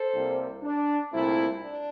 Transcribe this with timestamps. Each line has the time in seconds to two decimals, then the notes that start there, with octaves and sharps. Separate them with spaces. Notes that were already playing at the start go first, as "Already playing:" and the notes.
Already playing: A4 C5
0.14 C2 C3 G3 A#3
0.63 D4
1.12 C2 A#2 A3 C4 E4
1.61 D4